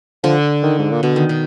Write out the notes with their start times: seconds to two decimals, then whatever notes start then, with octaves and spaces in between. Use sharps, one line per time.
0.23 D3 F3
0.63 D#3
0.79 G#2
0.91 A#2
1.03 B2 D3
1.16 D#3
1.29 B2